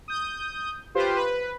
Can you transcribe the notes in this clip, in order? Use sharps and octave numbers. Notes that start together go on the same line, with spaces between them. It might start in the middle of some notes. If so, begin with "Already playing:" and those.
D#6 G6
F4 G4 B4 C5
B4